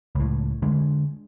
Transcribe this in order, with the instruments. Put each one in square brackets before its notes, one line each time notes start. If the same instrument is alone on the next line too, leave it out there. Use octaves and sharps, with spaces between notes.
[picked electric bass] C#2 A2
D3 G#3